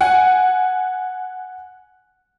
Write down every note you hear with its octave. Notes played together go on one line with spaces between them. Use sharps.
F#5 G#5